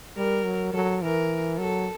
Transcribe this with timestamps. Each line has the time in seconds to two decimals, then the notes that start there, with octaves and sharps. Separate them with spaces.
0.17 G3 A#4
0.45 F#3
0.73 F#3 A4
1.02 E3 A#4
1.58 F#3 A4